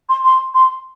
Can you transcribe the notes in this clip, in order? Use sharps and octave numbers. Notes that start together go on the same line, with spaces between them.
C6
C6
C6